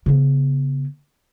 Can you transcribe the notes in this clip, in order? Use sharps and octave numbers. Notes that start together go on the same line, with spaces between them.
C#3 B3